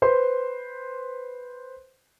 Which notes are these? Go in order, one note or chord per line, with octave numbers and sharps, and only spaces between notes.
B4 C5 C6